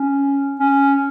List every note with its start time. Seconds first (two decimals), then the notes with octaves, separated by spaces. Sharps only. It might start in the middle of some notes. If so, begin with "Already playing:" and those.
Already playing: C#4
0.60 C#4